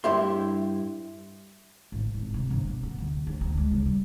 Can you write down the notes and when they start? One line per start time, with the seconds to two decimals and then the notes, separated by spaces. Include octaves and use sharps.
0.04 G2 E4 G4 E5 C6
1.92 A1
2.14 G#1
2.34 C3
2.50 G1
2.69 B2
2.83 B3
2.98 D2
3.27 D2
3.41 D2
3.57 G#3
3.71 C#3
3.86 G3